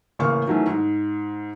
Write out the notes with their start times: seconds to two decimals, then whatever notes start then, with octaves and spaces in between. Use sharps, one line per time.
0.19 A1 C#3 A#3 F5 C#6
0.47 D#3 E3 F#3 A3 C#4
0.67 G#2